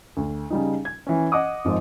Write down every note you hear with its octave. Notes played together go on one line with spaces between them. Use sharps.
D2
C#3 G3 D#4
G#6
E3 C#4
D#5 F#5 D6 D#6
G#1 G#2 F3 G#3